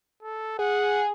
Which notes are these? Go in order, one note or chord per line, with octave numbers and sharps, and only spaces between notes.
A4
G#4 F#5